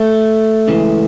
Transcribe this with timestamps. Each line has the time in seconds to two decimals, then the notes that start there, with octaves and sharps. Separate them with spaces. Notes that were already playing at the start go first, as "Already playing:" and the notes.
Already playing: A3
0.68 C#2 C#3 E3